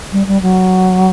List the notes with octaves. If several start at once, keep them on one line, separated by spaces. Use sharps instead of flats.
G3
G3
F#3